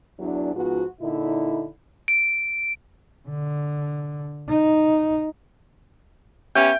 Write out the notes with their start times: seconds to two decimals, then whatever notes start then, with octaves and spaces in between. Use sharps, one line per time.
0.19 E2 E3 F#3 D4
0.54 G#2 F3 B3 F4 F#4
1.00 A#2 D3 D#4 E4
2.08 D7
3.29 D3
4.48 D#4
6.55 B3 C#4 G4 E5 G5